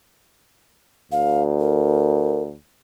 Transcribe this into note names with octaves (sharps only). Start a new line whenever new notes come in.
D2 F5
A#4